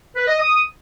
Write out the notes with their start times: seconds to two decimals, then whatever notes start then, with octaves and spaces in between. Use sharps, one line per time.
0.16 B4
0.28 D#5
0.40 D#6